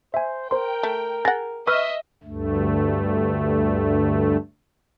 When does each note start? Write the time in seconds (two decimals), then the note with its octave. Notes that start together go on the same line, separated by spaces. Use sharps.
0.14 C5 E5 G#5
0.51 A#4 C5 G5 C6
0.83 A3
1.25 G#4 F#5 A6 A#6
1.67 B4 D#5 E5 C#6 E6 F6
2.23 D2 G2 A3